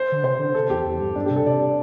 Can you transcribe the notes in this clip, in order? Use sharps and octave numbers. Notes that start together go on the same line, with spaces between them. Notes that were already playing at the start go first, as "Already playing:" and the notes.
Already playing: C5
D3
C3 C5
D3
C3 A4
E2 G4
E2
G2
G2 D4
C3 G4
A4
C3 D5